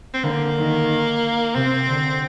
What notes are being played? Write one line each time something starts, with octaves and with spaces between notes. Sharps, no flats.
C4
D3 A#3
D#3
C3 C4
D3